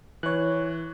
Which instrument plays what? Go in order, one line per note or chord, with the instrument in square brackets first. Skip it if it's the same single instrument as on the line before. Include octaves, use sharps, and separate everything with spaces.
[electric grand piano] E3 [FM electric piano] C#5 F#6